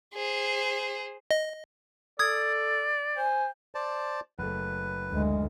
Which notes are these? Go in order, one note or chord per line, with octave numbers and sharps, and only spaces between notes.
G#4 C5
D#5
A4 D5 D#6 G#6
C5 G#5
C5 D5 A5
F#1 A3 B4
D2 G#3